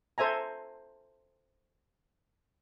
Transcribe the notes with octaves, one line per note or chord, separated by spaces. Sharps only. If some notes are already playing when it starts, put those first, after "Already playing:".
A4 C5 E5 G#5 A#5